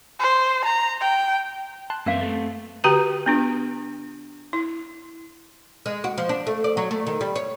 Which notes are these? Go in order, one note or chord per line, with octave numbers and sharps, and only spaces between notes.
C5
A#5
G5
A5 C6 F#6
F#2 A#3 C4 A#4 B4 E5 F5
A3 C4 A4
D3 F#4 G4 B4 G5 A#5
B3 D4 F4
E4
G#3
F#4
F3
D4
A3
D5
F#3
A3
D#3
G3
C#5